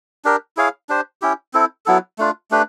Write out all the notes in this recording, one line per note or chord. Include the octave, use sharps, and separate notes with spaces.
D4 G4 A#4
E4 G#4 C#5 F5
D4 G4 C5
C#4 E4 G4
C4 E4 A4
F#3 B3 E4 A4
A3 D4 F4
A3 D4 G4 B4